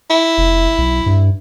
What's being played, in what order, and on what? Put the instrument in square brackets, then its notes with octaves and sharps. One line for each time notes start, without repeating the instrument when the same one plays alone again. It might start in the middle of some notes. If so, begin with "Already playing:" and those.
[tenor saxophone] E4
[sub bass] F1
B1
G2